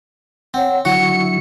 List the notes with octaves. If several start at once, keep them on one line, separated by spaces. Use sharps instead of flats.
C4 C#5 F#5
D3 F#3 E4 F#4 C#6 C#7